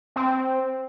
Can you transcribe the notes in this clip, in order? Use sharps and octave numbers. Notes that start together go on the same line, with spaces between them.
C4